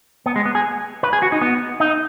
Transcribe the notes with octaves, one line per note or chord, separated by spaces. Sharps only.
B3
G#3
B3
G#4
B4
G#4
F#4
D#4
B3
D#4